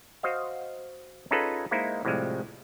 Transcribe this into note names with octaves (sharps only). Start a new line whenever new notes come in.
F#4 C5 D#5 F5
C#4 D#4 F4 G#4 A4 B4
G#3 A#3 D#4 E4 C5
A2 C3 F3 G3 G#3